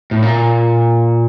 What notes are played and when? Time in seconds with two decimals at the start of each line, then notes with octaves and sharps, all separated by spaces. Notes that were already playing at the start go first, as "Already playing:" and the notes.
0.11 A2
0.22 A#2